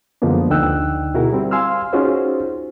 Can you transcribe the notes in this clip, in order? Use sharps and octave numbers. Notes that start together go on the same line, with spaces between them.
F#2 D3 F3 G#3 A#3 B3
D2 D3 D#4 G5 E6 F#6
B2 E4 F#4 G#4 A#4
G3 C4
F5 G#5 C6 E6 F6
C#4 D#4 F4 F#4 G#4 C5